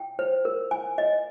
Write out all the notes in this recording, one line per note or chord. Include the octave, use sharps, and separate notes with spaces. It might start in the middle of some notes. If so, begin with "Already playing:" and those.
Already playing: G5
C5
A#4
G#5
D#5